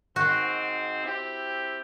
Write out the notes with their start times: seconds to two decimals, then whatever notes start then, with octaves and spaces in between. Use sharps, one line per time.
0.16 G#2 C4 F#4
1.04 C4 E4 G4